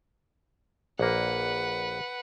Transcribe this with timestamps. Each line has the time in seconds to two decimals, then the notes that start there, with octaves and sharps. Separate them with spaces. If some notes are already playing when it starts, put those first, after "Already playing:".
0.99 A#1 A#3 B4 F#5